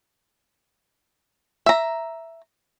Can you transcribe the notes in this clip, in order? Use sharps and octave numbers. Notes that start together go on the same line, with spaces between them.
E5 A#5